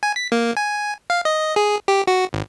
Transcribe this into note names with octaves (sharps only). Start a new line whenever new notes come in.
G#5
B6
A#3
G#5
F5
D#5
G#4
G4
F#4
G#1